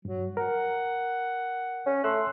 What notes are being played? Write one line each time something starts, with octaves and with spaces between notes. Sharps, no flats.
G2 F#3
A#4 F#5
C#4
A3 C6 E6 F#6